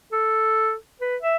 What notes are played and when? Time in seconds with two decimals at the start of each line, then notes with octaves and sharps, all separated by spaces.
0.12 A4
1.01 B4
1.22 E5